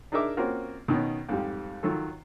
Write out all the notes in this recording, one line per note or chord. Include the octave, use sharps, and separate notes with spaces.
D4 D#4 G#4 A#4 E5 D6
A#3 C4 C#4 F4 F#4 A#4
B2 D#3 B3 C#4
F2 G#2 G3
D#3 F#3 F4 A4